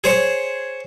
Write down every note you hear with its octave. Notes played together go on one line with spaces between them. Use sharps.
G#4 C5 C#5